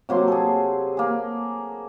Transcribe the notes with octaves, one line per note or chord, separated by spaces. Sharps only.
C3 F#3 A#3 C6
G#4 A4
A#3 G#4